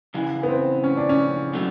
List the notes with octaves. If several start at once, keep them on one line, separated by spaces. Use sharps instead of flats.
E2 C#3 E3
B3
C4
C#4
D4
C#4
B2 F#3 A3